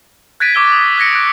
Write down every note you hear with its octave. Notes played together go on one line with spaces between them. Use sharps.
F#6 G#6 A6 B6 D7 D#7
C#6 D6 E6 G7
D#6
F#6 G#6 A#6 C#7 D7
F#6 D7